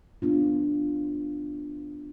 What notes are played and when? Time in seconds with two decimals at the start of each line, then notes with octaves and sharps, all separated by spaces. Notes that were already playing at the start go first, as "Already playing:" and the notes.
0.22 B3 D4 F4